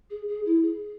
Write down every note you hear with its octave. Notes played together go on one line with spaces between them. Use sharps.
G#4
G#4
E4
G#4